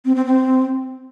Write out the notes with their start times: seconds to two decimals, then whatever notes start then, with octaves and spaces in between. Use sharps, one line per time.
0.05 C4
0.15 C4
0.25 C4